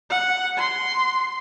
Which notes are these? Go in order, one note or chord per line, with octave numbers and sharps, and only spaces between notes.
F#5
C6